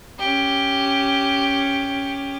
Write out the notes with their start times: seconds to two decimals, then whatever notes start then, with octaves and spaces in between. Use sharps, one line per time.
0.19 C#4 G4